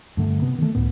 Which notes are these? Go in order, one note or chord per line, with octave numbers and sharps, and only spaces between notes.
G2 D3 A3
C3 B3
D#3 E3 A3
C#2 A2 B3